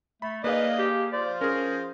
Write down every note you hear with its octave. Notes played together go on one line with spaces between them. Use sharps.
A3 B5
A#3 D#4 G#4 B4 D5 D#5 F5
G4
F4 C5 D5
C#4 G#4 A#4